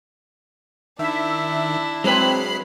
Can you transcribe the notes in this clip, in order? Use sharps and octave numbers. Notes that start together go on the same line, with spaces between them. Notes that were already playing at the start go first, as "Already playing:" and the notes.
D#3 D4 E4 E5
F#3 G#3 C4 B4 B5 C7